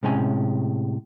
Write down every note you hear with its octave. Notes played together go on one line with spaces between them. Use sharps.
A2 C3 G#3 C#4 G#5